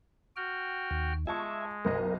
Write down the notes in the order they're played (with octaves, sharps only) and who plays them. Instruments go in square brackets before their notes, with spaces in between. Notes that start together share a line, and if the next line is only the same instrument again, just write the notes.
[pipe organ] F#4 G5 F6
[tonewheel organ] D#2
[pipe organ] G#3 [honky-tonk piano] F4 A5 C#6 [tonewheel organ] E5 G#5
[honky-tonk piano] F#1 B1 D#5 [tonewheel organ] A#4